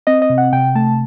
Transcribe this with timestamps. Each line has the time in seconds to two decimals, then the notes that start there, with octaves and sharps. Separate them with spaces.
0.07 C4 D#5
0.22 D#5
0.29 C3
0.38 F#5
0.53 C3 G5
0.75 A3 A5